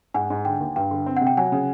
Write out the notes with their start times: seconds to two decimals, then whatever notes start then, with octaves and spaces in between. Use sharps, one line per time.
0.14 G#2 F#5 G#5
0.30 G#2
0.45 D3 G5
0.60 D#2
0.76 G2 G5
0.91 D3
1.06 C4
1.17 C3 F#5
1.27 G5
1.37 F#3 F#5 G#5
1.52 C#3